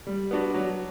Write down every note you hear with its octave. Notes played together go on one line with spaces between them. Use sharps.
G3
B3 D4 F#4
F#3